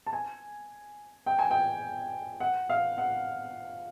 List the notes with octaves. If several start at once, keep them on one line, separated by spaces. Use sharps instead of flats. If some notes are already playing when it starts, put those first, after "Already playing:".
A5
G#5
G5
G#5
G5
F#5
F5
F#5